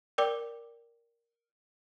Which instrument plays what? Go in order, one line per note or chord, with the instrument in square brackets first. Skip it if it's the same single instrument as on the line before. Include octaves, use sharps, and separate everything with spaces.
[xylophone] A#4 D5 G5 D6